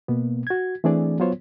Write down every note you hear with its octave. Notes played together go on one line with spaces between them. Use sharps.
B2 A#3 B3
F#4 G#6
E3 A3 C4 D4 G#4 D5
F#3 B3 F4 C5 C#5